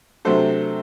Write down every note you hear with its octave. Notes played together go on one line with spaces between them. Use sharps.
C3 F#3 A3 D4 A4 C5